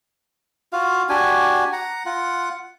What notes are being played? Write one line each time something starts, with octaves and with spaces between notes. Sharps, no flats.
F4 F#4 F5
D4 F#4 G4 G#5
F#5 A#5
F4 F#5